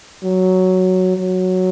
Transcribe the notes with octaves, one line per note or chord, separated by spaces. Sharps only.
F#3
F#3